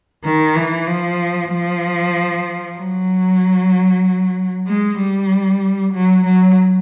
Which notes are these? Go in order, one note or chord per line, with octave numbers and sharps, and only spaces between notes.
D#3
E3
F3
F3
F#3
G#3
G3
F#3
F#3